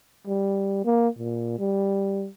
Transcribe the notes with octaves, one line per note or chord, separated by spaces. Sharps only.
G3
A#3
A#2
G3